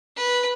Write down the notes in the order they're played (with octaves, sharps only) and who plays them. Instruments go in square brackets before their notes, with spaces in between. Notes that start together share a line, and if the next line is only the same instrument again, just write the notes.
[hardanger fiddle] B4